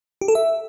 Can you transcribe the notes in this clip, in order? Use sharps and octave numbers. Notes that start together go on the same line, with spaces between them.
G4
A4
E5